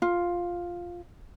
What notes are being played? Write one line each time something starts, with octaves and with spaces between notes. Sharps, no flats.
F4